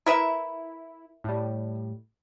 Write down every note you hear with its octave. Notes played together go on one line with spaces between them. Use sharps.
E4 A#4 B4 E5
A2 G3